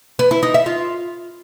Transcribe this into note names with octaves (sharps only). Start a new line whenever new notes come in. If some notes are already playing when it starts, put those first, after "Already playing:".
B4
E4
D#4
E5
F4